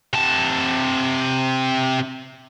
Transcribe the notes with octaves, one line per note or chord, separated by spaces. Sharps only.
C3 A5